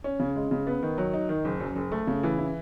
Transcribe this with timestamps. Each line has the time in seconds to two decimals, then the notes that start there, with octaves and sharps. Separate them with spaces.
0.04 C#4
0.20 C#3
0.36 G#3
0.51 C#3
0.67 B3
0.83 D#3
0.98 F#3
1.14 D#4
1.29 D#3
1.45 F#1
1.60 F#2
1.76 F#1
1.92 A3
2.07 C#3
2.23 E3
2.38 E4